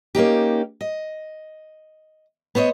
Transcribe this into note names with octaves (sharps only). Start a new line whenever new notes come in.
A#3 C#4 D#4 G4
D#5
B3 C5 C#5 D#5